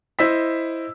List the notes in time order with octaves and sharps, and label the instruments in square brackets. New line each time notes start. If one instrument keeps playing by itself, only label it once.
[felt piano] E4 C5 D#5 E6 B6